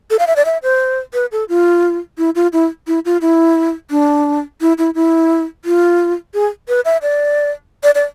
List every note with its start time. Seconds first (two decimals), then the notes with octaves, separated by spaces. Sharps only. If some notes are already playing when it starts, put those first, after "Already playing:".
0.10 A4
0.19 F5
0.27 E5
0.36 D5
0.46 E5
0.63 C5
1.14 B4
1.32 A4
1.49 F4
2.18 E4
2.35 F4
2.53 E4
2.87 E4
3.05 F4
3.21 E4
3.91 D4
4.61 E4
4.78 E4
4.95 E4
5.65 F4
6.34 G#4
6.68 B4
6.85 E5
7.02 D5
7.83 D5
7.95 D5